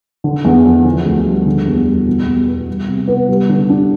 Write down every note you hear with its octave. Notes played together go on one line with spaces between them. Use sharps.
D3
E2
F3
D3
D2
G3
D3
E2
G3
B2
E2
B3
G3
C3
B3
G3
D3
D4